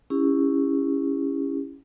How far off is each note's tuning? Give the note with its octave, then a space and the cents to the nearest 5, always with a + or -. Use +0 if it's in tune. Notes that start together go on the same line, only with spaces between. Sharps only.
C#4 +0 E4 +0 G4 +45